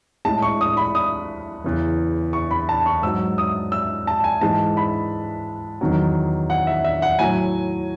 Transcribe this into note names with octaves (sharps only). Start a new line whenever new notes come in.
A2 G#3 A5
C#6
D#6
B5
D#6
E2 C#3 E3
C#6
B5
A5
C#6
G#2 F#3 E6
D#6
E6
A5
G#5
G#2 E3 G#3 A5
B5
E2 D#3 F#3
F#5
E5
E5
F#5
A2 F#3 G#5